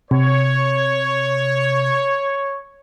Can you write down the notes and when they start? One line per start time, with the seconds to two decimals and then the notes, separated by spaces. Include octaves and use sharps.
0.11 C3 C#5